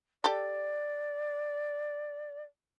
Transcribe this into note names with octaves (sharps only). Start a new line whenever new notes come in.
G4 A4 D5